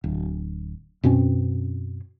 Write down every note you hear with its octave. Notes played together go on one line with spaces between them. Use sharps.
D1
F#2 B2 C4 C#4